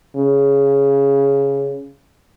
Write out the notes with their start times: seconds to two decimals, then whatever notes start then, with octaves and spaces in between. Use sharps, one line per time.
0.16 C#3